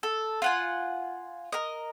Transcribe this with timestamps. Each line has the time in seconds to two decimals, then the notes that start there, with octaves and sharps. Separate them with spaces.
0.03 A4
0.42 F4 F#5 G#5
1.52 A#4 D#5